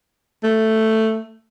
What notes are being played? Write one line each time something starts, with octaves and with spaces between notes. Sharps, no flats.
A3